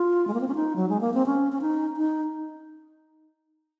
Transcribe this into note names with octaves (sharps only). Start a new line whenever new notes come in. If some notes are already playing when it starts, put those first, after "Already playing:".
Already playing: F4
G#3
A#3
C4
C#4
D#4
F#3
G#3
A#3
C4
C#4
C#4
D#4
D#4